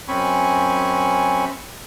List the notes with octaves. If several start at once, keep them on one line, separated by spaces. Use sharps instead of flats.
F#2 C4 C#4 G#5 B5 C#6